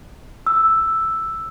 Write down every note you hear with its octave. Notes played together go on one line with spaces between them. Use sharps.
E6